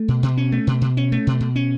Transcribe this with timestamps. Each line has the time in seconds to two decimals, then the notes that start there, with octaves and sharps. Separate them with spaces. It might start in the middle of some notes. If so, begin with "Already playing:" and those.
Already playing: A3
0.08 B2
0.23 B2
0.37 C#4
0.52 A3
0.67 B2
0.81 B2
0.97 C#4
1.12 A3
1.27 B2
1.40 B2
1.56 C#4